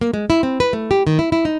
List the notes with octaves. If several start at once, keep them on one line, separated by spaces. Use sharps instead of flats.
A#3
G#3
E4
C4
B4
A3
G4
D#3
E4
E4
D#4